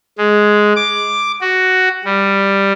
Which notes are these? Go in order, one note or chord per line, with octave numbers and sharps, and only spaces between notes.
G#3
D6
F#4
G3